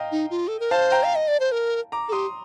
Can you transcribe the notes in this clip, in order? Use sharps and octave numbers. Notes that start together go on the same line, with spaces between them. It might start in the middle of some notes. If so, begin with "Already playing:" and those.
Already playing: D#5 F5 G5 A#5
D#4
F4
A4
A#4
C5 F5 A5
G5 A#5
F5
D#5
D5
C5
A#4
A#5 D6
A4
G4 C6 D#6